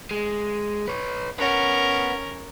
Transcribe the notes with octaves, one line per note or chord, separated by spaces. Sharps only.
G#3
B4 C#5
C#4 A#4 B4 F#5